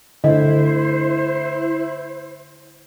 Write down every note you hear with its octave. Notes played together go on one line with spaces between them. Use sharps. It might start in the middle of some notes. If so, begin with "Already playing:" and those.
D3 E4 C5 D#5